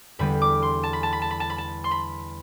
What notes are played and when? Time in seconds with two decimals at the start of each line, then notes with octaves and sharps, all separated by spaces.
0.19 E2 D3 G3 B3 B5
0.42 D6
0.62 C6
0.83 A5
0.93 B5
1.03 A5
1.13 B5
1.22 A5
1.31 B5
1.40 A5
1.50 B5
1.58 A5
1.84 C6
1.91 B5